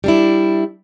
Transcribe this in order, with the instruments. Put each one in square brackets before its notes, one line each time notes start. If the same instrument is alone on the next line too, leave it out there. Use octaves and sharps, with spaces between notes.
[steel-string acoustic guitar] G3 D4 E4